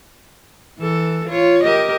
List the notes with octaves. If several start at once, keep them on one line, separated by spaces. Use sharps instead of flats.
E3 A4
F4 C#5
G4 A#4 D#5